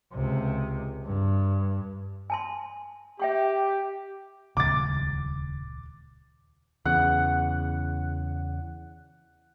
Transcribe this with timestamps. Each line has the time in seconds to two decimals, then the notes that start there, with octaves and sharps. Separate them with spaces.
0.13 C#2 C3
1.05 G2
2.30 G#5 A5 C6
3.20 G4 E5 G5 C#6
4.57 D#1 C#2 D6 A6
6.85 E2 C#3 F#5